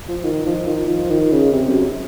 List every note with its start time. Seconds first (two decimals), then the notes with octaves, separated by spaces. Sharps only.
0.08 F3
0.25 D#3
0.46 F3
0.67 D#3
0.89 F3
1.11 D#3
1.32 C#3
1.52 C3
1.68 F#2